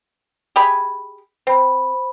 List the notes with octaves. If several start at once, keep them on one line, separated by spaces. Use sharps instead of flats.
G4 G#4 B5
C4 C5 B5